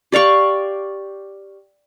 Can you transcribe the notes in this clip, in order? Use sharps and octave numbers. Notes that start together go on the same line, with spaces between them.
G4 D5 F5 C#6